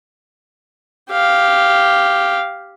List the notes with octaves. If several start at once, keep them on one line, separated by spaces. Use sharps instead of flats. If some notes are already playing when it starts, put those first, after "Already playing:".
G4 F5